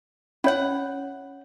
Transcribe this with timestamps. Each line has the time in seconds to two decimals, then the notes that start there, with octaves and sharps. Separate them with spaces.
0.44 C#4 E4 C#5 F#5